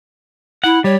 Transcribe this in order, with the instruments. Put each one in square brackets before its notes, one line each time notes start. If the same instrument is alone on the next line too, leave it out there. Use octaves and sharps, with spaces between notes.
[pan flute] E4 [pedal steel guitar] F#5
[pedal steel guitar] G3 [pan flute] C#5